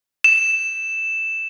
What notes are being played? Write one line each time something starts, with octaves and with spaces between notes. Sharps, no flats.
E7